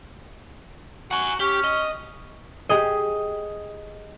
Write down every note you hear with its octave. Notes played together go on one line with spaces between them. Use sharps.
F#4 F#5 G#5
C#4 G4
D#5
G4 G#4 D#5